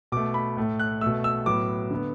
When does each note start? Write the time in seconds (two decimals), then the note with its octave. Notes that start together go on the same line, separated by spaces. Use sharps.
0.12 B2 A3 D6
0.34 B5
0.57 A2 A3
0.80 F#6
1.01 B2 A3 E6
1.24 E6
1.46 A2 F#3 B3 D6
1.91 D3 B3